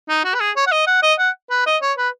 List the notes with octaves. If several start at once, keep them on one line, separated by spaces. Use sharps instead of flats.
D#4
F#4
B4
G#4
C#5
F#5
D#5
F#5
D#5
F#5
B4
D#5
C#5
B4